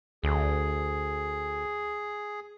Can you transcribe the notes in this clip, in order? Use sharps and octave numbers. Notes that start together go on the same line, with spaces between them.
D2 G#4